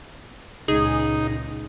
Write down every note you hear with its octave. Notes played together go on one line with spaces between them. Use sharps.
C#2 A#2 D#4 G#4